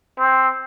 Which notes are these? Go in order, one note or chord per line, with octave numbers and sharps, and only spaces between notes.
C4